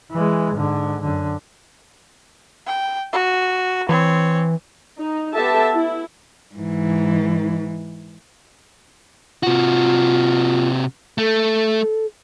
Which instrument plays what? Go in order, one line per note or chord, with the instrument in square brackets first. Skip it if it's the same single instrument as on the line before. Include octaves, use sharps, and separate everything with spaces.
[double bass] E3 G#3
G#2 D3
F#2 D3
[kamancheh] G5
F#4
[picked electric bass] E3 [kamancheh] C4 C#5
[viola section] D#4
B3 G4 A4 E5 A5
E4
[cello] G#2 E3
[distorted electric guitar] C3 F#4 [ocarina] F4
[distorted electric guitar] A3 [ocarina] A4